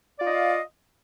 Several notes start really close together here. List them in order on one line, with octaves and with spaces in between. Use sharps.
D5 F4 D#5 F5